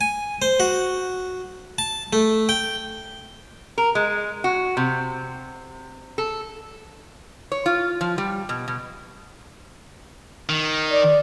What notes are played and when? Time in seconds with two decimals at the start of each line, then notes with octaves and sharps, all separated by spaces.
0.01 G#5
0.42 C5
0.60 F#4
1.78 A5
2.13 A3
2.49 G5
3.78 A#4
3.95 G#3
4.44 F#4
4.77 C3
6.18 A4
7.52 C#5
7.66 F4
8.01 F3
8.18 G3
8.49 B2
8.68 B2
10.49 D#3
10.90 D5